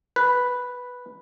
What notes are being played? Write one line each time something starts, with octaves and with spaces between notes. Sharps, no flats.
B4